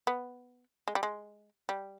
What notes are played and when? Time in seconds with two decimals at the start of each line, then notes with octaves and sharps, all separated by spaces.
0.07 B3
0.88 G#3
0.95 G3
1.03 G#3
1.69 G3